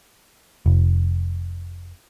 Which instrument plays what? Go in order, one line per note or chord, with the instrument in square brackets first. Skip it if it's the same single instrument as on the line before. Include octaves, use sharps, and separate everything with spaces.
[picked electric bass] F1